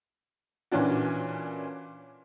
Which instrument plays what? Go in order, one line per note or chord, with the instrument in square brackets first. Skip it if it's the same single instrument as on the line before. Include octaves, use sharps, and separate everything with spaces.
[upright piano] A#2 E3 C#4 D4 F#4